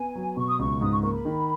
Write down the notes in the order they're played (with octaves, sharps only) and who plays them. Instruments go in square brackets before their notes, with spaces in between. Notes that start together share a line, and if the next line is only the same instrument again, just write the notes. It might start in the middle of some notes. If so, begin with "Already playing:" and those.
Already playing: [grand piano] B3 [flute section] G#5
[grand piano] F#3
[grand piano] B2 [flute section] C#6
[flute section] D#6
[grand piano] C#2 [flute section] C#6
[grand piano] G#2 [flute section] D#6
[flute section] C#6
[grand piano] A#3 [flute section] C#6
[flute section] B5
[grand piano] D#3